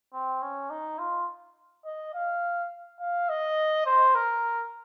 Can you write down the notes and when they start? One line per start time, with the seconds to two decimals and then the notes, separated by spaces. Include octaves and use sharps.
0.13 C4
0.42 C#4
0.70 D#4
0.98 F4
1.85 D#5
2.14 F5
3.00 F5
3.29 D#5
3.86 C5
4.15 A#4